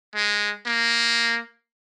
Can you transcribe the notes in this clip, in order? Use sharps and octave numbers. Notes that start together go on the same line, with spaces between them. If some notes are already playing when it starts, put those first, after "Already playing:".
G#3
A#3